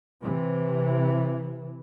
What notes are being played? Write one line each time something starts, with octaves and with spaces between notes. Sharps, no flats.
C3 E3